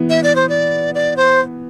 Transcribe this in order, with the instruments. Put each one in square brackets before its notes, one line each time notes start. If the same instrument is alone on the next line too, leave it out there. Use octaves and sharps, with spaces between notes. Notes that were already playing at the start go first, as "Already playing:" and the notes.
Already playing: [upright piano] E3 B3
[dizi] E5
D5
C5
D5
D5
C5